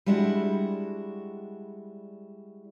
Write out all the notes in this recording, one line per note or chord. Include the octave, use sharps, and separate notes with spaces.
G3 G#3 D4 E4 F#4